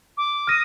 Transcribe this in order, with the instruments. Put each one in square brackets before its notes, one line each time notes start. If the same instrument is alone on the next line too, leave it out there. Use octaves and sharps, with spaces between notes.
[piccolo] D6
[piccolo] D#6 [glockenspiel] F6 A#6 D#7